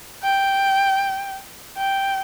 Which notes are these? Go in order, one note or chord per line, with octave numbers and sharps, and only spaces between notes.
G5
G5